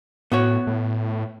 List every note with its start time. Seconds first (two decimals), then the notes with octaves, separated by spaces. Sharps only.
0.32 A2 B3 F#4 C#5
0.67 A2